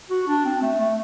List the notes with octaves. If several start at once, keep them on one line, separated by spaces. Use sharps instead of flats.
F#4
D4
C4
A3
A3